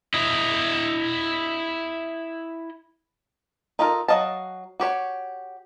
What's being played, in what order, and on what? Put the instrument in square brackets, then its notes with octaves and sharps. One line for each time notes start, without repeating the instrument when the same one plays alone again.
[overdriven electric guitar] E4 D#5
[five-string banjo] D#4 F4 A4 A#4
F#3 D#5 F5 A5
F#4 G4 C#5